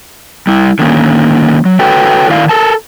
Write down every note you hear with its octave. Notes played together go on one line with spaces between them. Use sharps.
G3 E4
D3 D#3 A#3 C#4
F#3
F#4 A4 B4 C#5 G5
D#3 E4 D5 F5
A4 A#4 A5